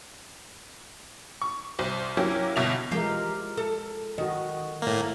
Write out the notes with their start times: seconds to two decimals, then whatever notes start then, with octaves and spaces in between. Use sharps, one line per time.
1.42 C#6
1.79 C2 C5
2.17 F#3 A#3 C#4 E4 G4
2.56 G1 B2 E5 F7
2.91 E3 F3 G#3 G4 A#4 F5
3.57 A4
4.18 D#3 F#4 D#5
4.82 A2 A#3